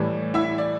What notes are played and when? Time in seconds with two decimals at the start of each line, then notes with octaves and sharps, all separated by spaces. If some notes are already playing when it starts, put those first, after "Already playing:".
Already playing: A2 E3 G3
0.34 E4 E5
0.58 D5